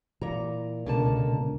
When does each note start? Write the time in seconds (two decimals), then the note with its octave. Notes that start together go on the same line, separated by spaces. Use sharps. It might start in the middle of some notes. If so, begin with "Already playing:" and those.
0.22 A#2 E3 A#5
0.86 C#2 B2 D3 A#4 A5